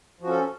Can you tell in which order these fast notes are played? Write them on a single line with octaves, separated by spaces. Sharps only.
F3 F#4 C#4 A4